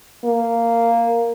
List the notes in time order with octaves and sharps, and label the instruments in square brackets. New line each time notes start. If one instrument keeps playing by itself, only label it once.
[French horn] A#3